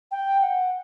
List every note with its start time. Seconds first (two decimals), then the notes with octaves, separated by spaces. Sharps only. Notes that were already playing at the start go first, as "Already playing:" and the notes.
0.11 G5
0.42 F#5